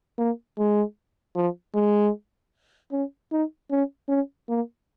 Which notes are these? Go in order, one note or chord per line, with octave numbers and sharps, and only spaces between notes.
A#3
G#3
F3
G#3
C#4
D#4
C#4
C#4
A#3